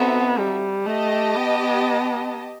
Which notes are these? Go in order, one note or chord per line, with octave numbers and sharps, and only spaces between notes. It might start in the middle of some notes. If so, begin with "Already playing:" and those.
Already playing: B3 C4 D#4 F#4 A4 E5
G3
A3 G4 D#5 A5
B3